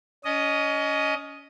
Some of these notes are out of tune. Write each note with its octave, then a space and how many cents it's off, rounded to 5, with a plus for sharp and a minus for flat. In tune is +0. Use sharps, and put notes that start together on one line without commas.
C#4 +30 D#5 +0